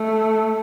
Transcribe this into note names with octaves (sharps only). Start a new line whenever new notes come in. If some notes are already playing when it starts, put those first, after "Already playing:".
Already playing: A3